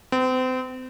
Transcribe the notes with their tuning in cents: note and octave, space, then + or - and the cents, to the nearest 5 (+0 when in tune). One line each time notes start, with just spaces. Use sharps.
C4 -35